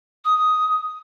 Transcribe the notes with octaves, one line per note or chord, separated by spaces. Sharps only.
D#6